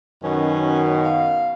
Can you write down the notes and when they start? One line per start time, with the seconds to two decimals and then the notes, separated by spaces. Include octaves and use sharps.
0.23 F#2 B2 D#3 C#4
1.05 F5